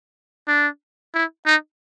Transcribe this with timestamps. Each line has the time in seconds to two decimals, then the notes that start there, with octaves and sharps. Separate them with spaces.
0.48 D4
1.14 E4
1.45 D#4